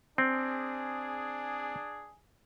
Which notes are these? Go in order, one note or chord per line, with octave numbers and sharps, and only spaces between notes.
C4 D4 G#4